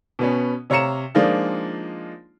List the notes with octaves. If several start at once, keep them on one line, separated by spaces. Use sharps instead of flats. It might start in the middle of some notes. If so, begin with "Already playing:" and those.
B2 B3 C#4
C3 C#5 F5 A#5 C#7 E7
F3 G#3 A#3 D4 D#4 F4